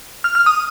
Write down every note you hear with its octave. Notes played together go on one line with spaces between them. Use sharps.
F6
F6
D#6